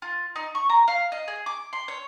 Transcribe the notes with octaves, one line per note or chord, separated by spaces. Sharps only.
F4
D#4
C#6
A#5
F5
D#5
G#4
D6
C6
C#5